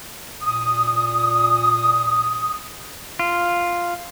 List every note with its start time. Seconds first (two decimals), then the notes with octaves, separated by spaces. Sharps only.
0.41 A#2 D#6
3.19 F4